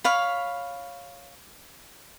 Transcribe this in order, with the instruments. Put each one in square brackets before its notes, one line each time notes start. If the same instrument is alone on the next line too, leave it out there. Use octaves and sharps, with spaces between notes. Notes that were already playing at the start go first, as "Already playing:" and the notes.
[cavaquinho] C#5 F5 B5